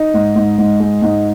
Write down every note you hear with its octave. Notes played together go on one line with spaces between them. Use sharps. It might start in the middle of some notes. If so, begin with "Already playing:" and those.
Already playing: D#4
G#2
G#2
G#2
G#3
G#2